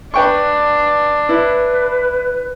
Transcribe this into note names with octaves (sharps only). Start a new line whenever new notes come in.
D4 B4 G5 C#6
E4 B4